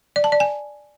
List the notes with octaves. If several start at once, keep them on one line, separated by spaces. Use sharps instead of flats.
D5
A5
D5
G#5